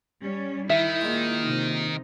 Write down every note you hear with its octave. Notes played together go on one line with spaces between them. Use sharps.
G3 C#4
D#3 E4 E5
A#2 G#3
C3 D#4